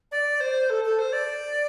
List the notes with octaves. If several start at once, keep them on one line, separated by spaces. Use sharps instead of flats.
D5
C5
A4
A4
C5
D5